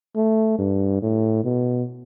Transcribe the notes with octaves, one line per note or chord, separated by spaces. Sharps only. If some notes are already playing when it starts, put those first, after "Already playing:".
A3
G2
A2
B2